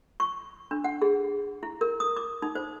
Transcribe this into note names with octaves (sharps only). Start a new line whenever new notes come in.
C#6
D4
F#5
G#4
E4
A#4
D#6
D6
D#4
C5